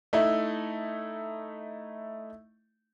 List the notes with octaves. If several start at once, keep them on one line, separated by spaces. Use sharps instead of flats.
A3 D#4 E4